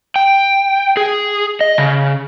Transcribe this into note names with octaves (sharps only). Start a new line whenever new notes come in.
G5
G#4
D#5
C#3